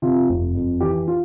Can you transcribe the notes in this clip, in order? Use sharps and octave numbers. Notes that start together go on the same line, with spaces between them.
C3 F4
F1
F2
E3 G4
F4